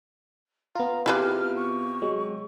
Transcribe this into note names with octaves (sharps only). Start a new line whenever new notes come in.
B3 F4 A#5
C3 E4 G4 G#4 B4 D6 F6
C#6
F#3 G#3